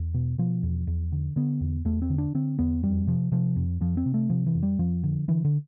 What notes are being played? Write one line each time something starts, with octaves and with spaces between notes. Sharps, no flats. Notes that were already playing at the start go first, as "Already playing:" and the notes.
Already playing: E2
B2
B2 F3
E2
E2
D3
D3 B3
E2
E2 A3
C4
D3
D4
D3 C4
E2 B3
F2 G3
C3 F3
C3 F3
F2
F2 F3
C4
C3
A3
C3 F3
E3
F2
G3
F2 F3
D3
D3 E3
D3